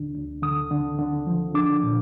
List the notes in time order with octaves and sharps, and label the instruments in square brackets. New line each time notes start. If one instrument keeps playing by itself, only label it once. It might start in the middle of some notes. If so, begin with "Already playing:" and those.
Already playing: [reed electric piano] D2 D3 D4
D2
D3 D#6
D3
D3
F3
D4 D6
A#2